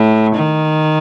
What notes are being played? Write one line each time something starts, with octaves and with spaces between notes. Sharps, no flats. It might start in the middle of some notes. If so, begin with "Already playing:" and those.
Already playing: A2
D#3